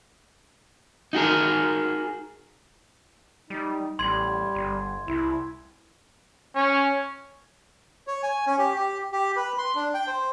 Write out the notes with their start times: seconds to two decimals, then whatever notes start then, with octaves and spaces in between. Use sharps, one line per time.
1.13 D#4 F#4 G#4 A#4
3.50 G3 D#4
3.99 A1 G3 C6 G#6
4.55 G1
5.08 C2 E4
6.55 C#4
8.07 C#5
8.23 G#5
8.46 C#4
8.59 G4
8.76 G4
9.12 G4
9.36 B4
9.58 C6
9.75 D4
9.94 G5
10.07 C5